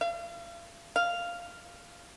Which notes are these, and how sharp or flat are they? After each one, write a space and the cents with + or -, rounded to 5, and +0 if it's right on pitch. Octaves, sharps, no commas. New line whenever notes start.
F5 -40
F5 -5